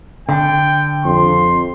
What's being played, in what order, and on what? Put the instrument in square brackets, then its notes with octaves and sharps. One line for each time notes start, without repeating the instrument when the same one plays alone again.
[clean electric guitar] D3 [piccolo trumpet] G5
[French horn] F2 [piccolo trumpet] C6